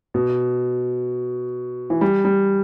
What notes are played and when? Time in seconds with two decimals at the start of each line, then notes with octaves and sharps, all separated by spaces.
0.14 B2
1.90 E3
2.01 G3
2.25 G3